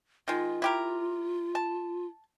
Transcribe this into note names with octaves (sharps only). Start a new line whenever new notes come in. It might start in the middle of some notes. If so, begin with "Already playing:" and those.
D#3 G#3 F4
E4 G4 A#4
A5